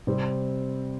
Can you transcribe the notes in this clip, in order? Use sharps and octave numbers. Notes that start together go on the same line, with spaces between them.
C3 G3 C4